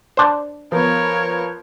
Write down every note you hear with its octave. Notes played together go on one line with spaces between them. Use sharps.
D4 C5
F3 B3 A#4 C#5